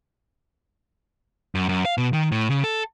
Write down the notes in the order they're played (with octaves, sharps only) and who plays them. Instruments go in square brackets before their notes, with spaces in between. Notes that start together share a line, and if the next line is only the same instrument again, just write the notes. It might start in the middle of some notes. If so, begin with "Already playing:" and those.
[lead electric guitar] F#2
F#2
F5
B2
D#3
A2
C#3
A4